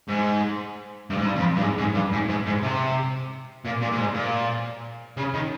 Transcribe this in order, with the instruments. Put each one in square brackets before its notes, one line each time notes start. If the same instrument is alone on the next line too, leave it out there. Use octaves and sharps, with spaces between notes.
[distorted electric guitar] G#2
G2
G#2
G2
F2
G2
G#2
G#2
G2
G#2
G#2
G#2
C3
A#2
A#2
A#2
G#2
A#2
C#3
D#3